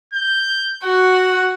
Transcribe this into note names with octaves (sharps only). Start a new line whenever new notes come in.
G6
F#4 F#5